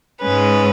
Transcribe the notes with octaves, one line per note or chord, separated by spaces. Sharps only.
G#2 G#3 C#4 B4